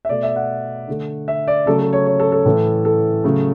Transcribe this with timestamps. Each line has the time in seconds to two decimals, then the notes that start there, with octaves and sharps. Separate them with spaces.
0.05 E5
0.09 B2 A3 D5
0.23 E5
0.36 F#5
0.88 D3 A3
1.28 E5
1.47 D5
1.66 C#3 F#3 A3 A4
1.79 A4
1.93 C#5
2.06 C#5
2.20 A4
2.32 A4
2.45 A2 E3 A3
2.85 A4
3.24 C#3 F#3 A3